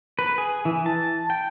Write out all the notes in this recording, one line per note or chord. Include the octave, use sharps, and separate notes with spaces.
B4
G#4
E3
A5
G5